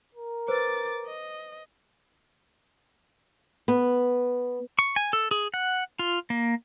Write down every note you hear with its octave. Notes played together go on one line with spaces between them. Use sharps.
A#4
B4 C5 D6 A6
D#5
B3
C#6
G#5
A4
G#4
F#5
F4
A#3